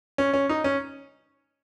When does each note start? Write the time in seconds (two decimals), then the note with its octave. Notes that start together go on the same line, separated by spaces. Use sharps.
0.18 C#4
0.34 C#4
0.49 D#4
0.64 C#4